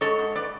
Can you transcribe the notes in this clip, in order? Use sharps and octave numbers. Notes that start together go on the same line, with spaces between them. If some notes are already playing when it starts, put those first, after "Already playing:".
G#2 A4 C#5
G#2
B4 D5